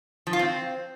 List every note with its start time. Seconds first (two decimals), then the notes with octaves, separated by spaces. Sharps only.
0.27 F3
0.33 F4
0.39 C4